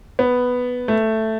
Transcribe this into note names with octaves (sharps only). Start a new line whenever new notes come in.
B3
A3